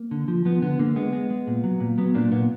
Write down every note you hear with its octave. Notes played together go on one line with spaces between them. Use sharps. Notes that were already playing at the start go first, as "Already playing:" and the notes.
Already playing: A#3
D3
F3
F3 B3
D3 B3
D3 A#3
G#3 B3
G#3
G#3
A#2
F#3
A#2
F#3 B3
A#2 A#3 D4
A#2 B3